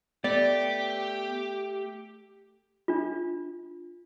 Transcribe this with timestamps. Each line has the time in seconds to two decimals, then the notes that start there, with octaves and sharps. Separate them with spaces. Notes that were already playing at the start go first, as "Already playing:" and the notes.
0.24 A3 B3 G4 D5
2.88 D4 F4